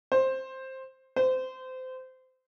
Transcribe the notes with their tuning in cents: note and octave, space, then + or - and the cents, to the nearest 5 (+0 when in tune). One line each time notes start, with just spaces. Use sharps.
C5 +10
C5 -25